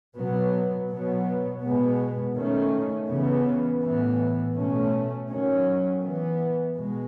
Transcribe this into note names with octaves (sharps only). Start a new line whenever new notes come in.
B2 F#3 B3
B2 F#3 B3
B2 G#3 B3
D#3 A3 C#4
C#3 E3 B3
A2 E3 B3
B2 A3 C#4
D#3 F#3 C#4
E3 B3
B2 G#3